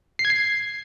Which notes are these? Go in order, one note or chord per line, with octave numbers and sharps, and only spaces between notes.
C7
G#6
C7